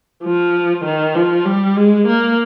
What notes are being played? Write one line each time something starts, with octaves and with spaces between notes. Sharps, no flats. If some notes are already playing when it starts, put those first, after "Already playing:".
F3
D#3
F3
G3
G#3
A#3